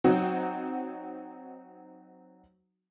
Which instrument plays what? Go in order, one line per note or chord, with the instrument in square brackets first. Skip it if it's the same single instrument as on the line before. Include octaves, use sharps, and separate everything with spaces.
[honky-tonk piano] F#3 C4 D#4 F#4